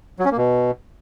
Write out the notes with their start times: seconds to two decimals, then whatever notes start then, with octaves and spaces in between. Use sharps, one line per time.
0.19 F#3
0.25 C#4
0.31 A#3
0.37 B2